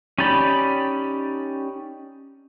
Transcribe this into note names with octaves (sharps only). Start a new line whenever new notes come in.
C#4 D#4 G4 D5 B5